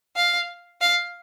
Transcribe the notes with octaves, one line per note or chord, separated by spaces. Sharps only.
F5
F5